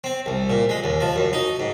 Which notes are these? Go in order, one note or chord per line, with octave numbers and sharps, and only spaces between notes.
C4
C2
A#2
G#3
D#2
F3
F#2
D#4
G#2